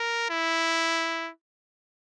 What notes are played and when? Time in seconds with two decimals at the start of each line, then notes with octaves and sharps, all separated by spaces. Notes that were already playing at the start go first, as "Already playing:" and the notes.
Already playing: A#4
0.30 E4